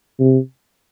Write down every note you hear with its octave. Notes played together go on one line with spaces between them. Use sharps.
C3